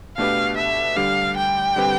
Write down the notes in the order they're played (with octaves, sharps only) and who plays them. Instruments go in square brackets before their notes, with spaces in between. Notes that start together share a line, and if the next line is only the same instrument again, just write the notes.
[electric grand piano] B2 A3 D4 G4 B4 [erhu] F5
[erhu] E5
[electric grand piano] D3 G3 D4 G4 [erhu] F5
[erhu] G5
[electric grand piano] D3 G3 C4 G4 B4